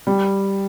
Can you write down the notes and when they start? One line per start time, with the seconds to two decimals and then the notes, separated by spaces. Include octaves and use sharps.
0.07 G3